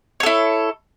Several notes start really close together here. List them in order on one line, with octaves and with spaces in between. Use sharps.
C#5 A4 E4